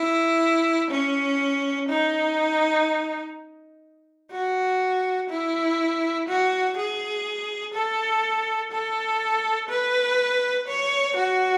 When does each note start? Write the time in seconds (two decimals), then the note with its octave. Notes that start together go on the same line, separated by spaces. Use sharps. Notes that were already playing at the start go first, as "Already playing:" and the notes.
Already playing: E4
0.91 C#4
1.89 D#4
4.32 F#4
5.30 E4
6.28 F#4
6.77 G#4
7.74 A4
8.71 A4
9.69 B4
10.67 C#5
11.16 F#4